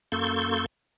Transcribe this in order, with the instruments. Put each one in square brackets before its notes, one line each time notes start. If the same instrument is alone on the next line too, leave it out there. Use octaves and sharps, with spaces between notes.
[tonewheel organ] F#2 A#3 A4 C6 C#6 G6